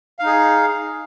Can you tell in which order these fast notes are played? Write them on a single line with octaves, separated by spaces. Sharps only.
F5 D#4 G#4